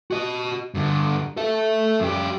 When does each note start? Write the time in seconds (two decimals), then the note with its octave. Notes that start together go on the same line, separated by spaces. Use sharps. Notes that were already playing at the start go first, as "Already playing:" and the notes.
0.11 F#4 D#5
0.74 G2 D3
1.37 A4 E5
2.00 F#2 G4